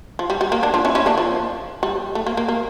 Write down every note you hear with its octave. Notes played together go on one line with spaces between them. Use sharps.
F3
G3
G3
A#3
A#3 D4
D4 F4
C#4 E4
C#4 E4
A#3 D4
F3
G3
A3
A#3
A#3
A#3